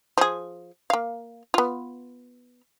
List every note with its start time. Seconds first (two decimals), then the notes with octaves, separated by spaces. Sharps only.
0.18 F3 G#4
0.90 A#3 F5
1.54 B3 F4